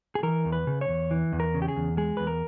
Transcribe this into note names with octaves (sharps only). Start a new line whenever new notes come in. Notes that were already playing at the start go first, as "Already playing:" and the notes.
G#4
E3 A#4
E2
B4
C#3
C#5
E2
E3
E2
A#4
C#3
G4
G#4
E2
G#3 G#4
E2 B4
A#4